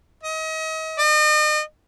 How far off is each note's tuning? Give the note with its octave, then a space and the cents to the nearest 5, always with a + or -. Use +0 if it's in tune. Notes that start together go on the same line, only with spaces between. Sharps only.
D#5 +35
D#5 -40